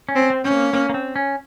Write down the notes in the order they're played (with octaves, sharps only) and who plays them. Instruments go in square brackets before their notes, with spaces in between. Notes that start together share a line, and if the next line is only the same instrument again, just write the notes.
[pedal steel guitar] C#4
[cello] C4
[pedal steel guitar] C4
[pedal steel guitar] C4 [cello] C#4
[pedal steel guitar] A#3
A#3
A#3
C4
C#4